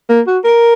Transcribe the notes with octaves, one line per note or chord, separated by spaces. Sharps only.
A#3
F#4
A#4